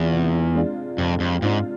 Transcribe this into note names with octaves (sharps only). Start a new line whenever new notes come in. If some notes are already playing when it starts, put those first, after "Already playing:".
Already playing: E2 C3 G#3 D4 F4
C3
G#3 D4 F4
F2 C3
F2
G#2 G#3 D4 F4